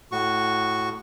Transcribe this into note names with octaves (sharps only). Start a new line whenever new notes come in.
A2 F#4 C#6